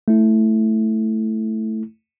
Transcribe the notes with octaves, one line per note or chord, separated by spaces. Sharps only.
A3 E4